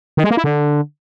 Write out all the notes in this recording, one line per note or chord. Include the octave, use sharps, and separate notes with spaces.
D#3
G#3
A#3
E4
D3